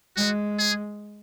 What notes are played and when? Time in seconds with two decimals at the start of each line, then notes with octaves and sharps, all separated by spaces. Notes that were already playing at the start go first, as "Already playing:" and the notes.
0.17 G#3 F#4
0.59 G#4